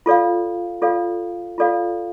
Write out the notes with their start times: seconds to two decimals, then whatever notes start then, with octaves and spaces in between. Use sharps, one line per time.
0.06 F4 A4 D5 F5
0.82 F4 A4 D5 F5
1.58 F4 A4 D5 F5